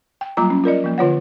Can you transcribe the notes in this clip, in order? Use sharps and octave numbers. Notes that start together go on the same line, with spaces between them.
G5
F#3 G3 A#3 F4 A#5 D6
C#4
F4 A#4 D5 D#5
F3 A#3
D3 F4 C#5 F#5